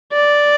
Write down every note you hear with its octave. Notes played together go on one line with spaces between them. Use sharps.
D5